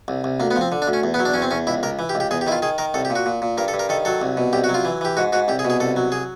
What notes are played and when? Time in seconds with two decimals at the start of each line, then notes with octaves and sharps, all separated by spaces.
0.08 C2
0.24 C2
0.40 D2 A#3
0.51 B3
0.56 F3
0.61 C4
0.72 D3
0.82 D4
0.87 D2
0.93 C#4
1.04 E2
1.14 B3
1.19 F#3
1.25 D4
1.34 E2 C#4
1.42 C4
1.51 E2 C#4
1.67 C#2 E4
1.83 C#2 A#4
1.99 E3
2.09 G4
2.15 C#2
2.20 G4
2.31 E2 G#4
2.41 G4
2.47 D#3 E4
2.52 F4
2.62 D#3 G#4
2.78 D#3 A#4
2.94 C2 A4
3.05 G4
3.10 A#2
3.16 F#4
3.26 A#2
3.42 A#2
3.58 G2 A#4
3.68 A4
3.74 G2
3.79 A#4
3.89 D#3 A4
4.05 F#3 A4
4.21 C2
4.37 B2
4.53 C2 G4
4.64 F#4
4.69 F#3
4.74 F4
4.85 E3
5.01 E3 G4
5.17 G#2 F#4
5.32 G#2 F#4
5.48 C2 G4
5.59 G#4
5.65 B2
5.70 G#4
5.80 C2 A4
5.96 F#3
6.12 G#4